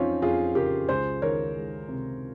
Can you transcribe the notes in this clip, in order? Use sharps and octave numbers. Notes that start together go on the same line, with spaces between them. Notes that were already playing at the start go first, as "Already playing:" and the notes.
Already playing: F2 F3 C4 C#4 D#4 F4
F2 F4 G#4
C#3 G4 A#4
C#2 G#4 C5
D#3 A#4 C#5
G#3
C3